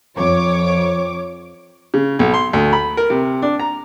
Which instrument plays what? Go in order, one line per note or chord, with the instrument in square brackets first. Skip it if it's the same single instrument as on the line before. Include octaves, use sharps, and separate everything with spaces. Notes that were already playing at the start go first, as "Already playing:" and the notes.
[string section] F2 C#5 D6
[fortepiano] C#3
B1
C6
D2
B5
A#4
C3
D4
A#5